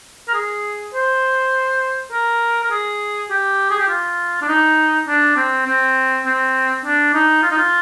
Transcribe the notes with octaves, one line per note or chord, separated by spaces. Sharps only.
A#4
G#4
C5
A#4
A#4
G#4
G4
G#4
G4
F4
D4
D#4
D4
C4
C4
C4
D4
D#4
F4
D#4
F4